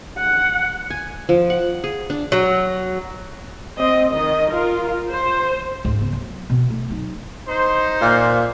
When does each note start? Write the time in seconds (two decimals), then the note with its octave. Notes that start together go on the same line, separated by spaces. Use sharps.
0.18 F#5
0.90 G#5
1.29 F3
1.50 F#5
1.84 G#4
2.10 D4
2.32 F#3
3.78 C4 D#5
4.13 D#3 D#5
4.53 F4 A#4
5.11 C5
5.84 D2 G#2
5.99 C#3 B3
6.13 F#3
6.50 B2
6.70 A3
6.91 F#3 D#4
7.47 D#4 C5
8.01 A#2